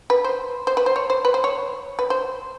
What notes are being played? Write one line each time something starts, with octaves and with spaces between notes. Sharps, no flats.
B4
C5
C5
B4
C5
C#5
C5
B4
C5
C#5
B4
C5